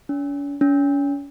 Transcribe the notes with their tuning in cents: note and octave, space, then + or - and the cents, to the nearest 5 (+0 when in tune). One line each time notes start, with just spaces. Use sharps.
C#4 +45
C#4 +35